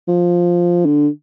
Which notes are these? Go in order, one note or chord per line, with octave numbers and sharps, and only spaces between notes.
F3
D3